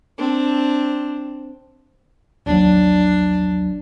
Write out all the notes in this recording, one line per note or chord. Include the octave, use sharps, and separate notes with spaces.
C4 D4
A1 D#2 F#3 D4